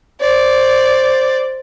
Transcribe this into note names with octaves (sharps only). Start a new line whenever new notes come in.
C5 D5